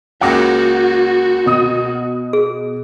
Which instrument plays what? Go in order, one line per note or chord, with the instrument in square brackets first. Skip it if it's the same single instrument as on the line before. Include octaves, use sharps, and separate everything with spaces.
[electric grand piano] C#2 C#3 A#3 [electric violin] F#4 [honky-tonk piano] F#5 D6 A#6
[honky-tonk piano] B2 D#6
[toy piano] G#4